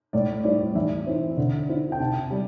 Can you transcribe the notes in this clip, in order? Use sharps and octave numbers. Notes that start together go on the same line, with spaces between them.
A2 D5
G3 C4 E4 D5
E3 E5
C4 E4
D3
C4 E4
G5
C3 A5
G3